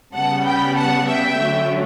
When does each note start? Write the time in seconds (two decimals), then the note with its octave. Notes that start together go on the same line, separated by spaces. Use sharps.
0.15 C#3 G3 B3 F#5 A5
0.46 G5 B5
0.76 F#5 A5
1.08 E5 G5
1.38 D3 F#3 A3 C#4